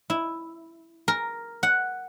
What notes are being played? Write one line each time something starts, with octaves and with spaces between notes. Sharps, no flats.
E4
A#4
F#5